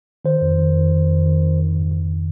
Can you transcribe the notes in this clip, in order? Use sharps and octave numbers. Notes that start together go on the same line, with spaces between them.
D#3 C5
F2
D#3
F2
D#3
F2
D#3
F2
D#3
G#2
D#3